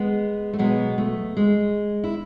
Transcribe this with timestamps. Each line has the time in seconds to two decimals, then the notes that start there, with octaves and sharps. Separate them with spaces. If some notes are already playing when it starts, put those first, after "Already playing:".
Already playing: G#3 B3
0.53 A3
0.59 B2 F#3 G#3 B3
0.98 A3
1.37 G#3
2.04 E4